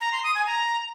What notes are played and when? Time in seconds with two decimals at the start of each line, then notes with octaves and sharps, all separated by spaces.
0.01 A#5
0.12 C6
0.24 D#6
0.35 G#5
0.46 A#5